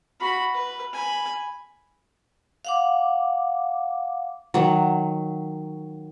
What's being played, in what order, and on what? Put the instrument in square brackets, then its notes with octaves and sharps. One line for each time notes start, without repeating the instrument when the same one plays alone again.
[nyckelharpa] F#4 B5
B4
G#5 B5
[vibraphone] F5 F#5 D6
[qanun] D#3 F#3